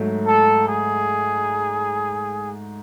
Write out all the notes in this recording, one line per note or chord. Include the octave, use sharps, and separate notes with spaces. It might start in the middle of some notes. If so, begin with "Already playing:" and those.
Already playing: G#2 F#3 A3
A4
G#4